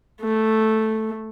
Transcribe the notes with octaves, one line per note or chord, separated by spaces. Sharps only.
A3